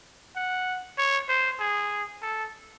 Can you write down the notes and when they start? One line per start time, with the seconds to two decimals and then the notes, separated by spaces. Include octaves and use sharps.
0.36 F#5
0.98 C#5
1.29 C5
1.60 G#4
2.22 A4